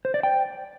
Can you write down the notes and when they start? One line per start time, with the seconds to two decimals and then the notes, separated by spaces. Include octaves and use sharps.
0.05 C5
0.14 D5
0.23 G5